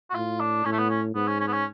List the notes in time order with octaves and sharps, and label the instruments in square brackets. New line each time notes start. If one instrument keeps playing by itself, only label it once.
[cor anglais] F#4
[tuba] A2 [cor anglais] F4
[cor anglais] D4
[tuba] A2 [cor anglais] C#4
[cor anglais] A3
B3
C#4
[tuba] G#2 [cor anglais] B3
[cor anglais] C#4
C#4
B3
C#4